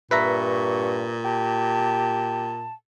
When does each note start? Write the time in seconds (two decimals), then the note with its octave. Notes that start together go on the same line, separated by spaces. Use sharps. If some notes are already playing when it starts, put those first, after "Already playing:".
0.11 G2 A#2 B4 E5 A#5 C#6
1.25 G4 A5